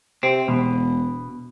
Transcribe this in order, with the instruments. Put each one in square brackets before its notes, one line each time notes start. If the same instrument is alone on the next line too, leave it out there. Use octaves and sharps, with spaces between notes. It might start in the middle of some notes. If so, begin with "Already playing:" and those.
[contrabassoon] C3 [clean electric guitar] C4
[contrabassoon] E1 [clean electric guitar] B2